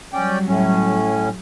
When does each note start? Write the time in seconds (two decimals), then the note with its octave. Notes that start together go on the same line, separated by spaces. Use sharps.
0.13 F#3 G3 C#4 D5 G5
0.47 A2 C#4